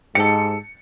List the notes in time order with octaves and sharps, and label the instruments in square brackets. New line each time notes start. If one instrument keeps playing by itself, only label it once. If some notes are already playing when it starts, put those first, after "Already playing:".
[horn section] G#2 [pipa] G4 A4 [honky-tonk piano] C#7